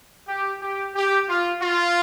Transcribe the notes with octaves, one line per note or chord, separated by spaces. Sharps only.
G4
G4
G4
F4
F4